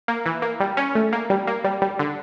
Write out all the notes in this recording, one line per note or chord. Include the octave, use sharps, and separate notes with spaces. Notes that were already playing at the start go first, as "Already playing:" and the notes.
A#3
E3
A#3
G3
C#4
A3
A#3
G3
A#3
G3
G3
D3